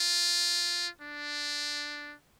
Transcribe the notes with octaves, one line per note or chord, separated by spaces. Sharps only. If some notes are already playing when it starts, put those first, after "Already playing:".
Already playing: F4
D4